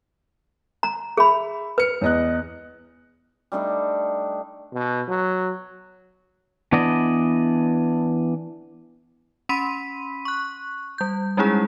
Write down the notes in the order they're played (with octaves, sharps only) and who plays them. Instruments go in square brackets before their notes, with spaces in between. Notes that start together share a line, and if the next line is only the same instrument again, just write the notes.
[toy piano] A#5
[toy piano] G#4 B5 [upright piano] E5
[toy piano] B4 [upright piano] F6 C#7
[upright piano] E2 D#5 F#6
[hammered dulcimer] G3 A3 D4 D#4
[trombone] B2
F#3
[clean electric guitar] E3 B3 D4 D5 D#5
[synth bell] C#4 B5 C6 B6 D#7
C#6 F#6
G3 G6
G3 G#3 C#4 D#4 E4 G#4